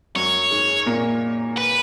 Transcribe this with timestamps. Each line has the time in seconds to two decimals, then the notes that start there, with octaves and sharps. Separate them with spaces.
0.15 F#2 F#3 C#5
0.51 G#2 G#3
0.86 A#2 A#3
1.58 B4